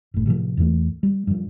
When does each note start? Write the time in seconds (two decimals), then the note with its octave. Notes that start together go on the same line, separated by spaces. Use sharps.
0.14 F#1 A2
0.26 A2 C3 D#3 F3
0.57 E2 G2 E3 A3
1.03 G3
1.27 G2 F3